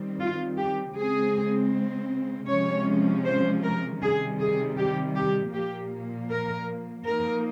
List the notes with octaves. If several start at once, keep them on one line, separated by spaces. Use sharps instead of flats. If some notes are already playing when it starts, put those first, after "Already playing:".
Already playing: D#3 G3 C4
F4
G4
C#3 G#3 C4 G#4
C3 F3 G#3 C#4 C#5
C5
A#4
C3 D#3 G3 G#4
G#4
G4
G4
A#2 F3 A#3 G4
A#4
F3 A#3 D#4 A#4